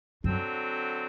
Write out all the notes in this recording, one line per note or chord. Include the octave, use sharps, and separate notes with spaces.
F#2 D3 F#3 C4